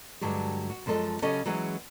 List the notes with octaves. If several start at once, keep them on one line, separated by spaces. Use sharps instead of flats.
G2 D3 F#3 G#3 G4
F#4
F#2 F3 G#3 C4 A4 D#5
C#3 F#3 C#4 G4 A4 D#5
E3 F#3 G#3 C#4 G#4